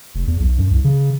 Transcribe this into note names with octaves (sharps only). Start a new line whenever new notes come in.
F1
E2
B1
F#2
C2
C#3